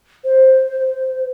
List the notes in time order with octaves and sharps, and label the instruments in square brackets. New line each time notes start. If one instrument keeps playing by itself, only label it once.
[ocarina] C5